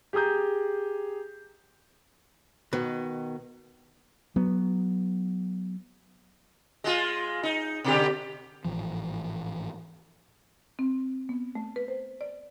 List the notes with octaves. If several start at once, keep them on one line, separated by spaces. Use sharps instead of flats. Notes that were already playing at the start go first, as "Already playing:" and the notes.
G4 G#4 A#5 D#6 G6
B2 D#3
F#3 B3
G#3 F4
D#4
B2 D3 G4
G#1 A2 E3 F3
C4
B3
A3
B4
C5
D5